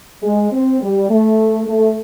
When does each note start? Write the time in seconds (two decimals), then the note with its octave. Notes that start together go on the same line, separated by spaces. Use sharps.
0.22 G#3
0.51 C4
0.80 G3
1.09 A3
1.66 A3